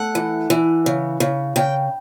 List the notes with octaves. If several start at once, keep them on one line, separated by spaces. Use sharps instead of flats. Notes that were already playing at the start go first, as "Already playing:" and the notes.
Already playing: A3 F#5
E3
E3
C#3
C#3
C#3 G5